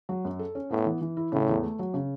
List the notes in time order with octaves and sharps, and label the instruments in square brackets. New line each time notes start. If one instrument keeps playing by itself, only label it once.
[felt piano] F#3
F#2
A4
C#4
[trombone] A2 [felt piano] B3
[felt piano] E3
E3
E4
[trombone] A2 [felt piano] C#3
[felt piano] E2
A3
F#3
C#3